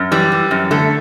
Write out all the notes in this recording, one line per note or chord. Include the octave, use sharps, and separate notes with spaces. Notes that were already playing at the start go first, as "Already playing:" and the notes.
Already playing: F#2
E3 G3
E3
F#2
D3 A3